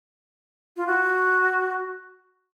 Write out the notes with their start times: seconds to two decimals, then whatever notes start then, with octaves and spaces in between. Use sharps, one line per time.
0.77 F4
0.87 F#4